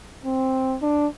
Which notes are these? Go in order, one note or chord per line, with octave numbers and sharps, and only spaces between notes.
C4
D4